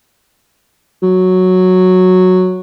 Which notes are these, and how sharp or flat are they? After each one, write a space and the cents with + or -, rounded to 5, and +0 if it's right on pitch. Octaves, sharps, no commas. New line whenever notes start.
F#3 -5